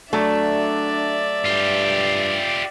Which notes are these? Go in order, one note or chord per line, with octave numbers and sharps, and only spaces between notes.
F#3 A3 D4 D5 E5
G2 F4 G4